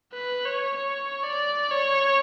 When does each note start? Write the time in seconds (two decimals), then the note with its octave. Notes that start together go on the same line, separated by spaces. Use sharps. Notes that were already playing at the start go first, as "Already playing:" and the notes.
0.13 B4
0.45 C#5
0.76 C#5
1.24 D5
1.71 C#5